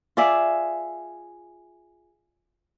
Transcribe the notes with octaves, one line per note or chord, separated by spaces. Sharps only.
F4 G#4 D5 E5